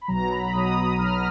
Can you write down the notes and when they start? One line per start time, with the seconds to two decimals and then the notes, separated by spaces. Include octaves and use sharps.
0.01 B5
0.08 B1 B2 F#3 A#5
0.31 B5
0.53 B1 B2 F#3 D#6
0.76 D#6
0.98 B1 B2 F#3 F6